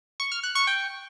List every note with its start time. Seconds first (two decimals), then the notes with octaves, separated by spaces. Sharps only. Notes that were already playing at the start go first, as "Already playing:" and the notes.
0.20 C#6
0.32 F6
0.43 F#6
0.55 C#6
0.67 G5